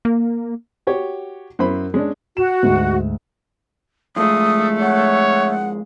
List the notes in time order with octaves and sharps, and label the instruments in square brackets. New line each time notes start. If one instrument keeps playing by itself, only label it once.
[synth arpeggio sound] A#3
[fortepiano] F#4 G4 C#5
F#2 E4 C5 B5
G#3 C#4 D4
[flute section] F#4 [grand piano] E7
[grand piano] D2 G#2
[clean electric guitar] F2 G#3 [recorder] A3 [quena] D#6
[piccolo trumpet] C#5 [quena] F#5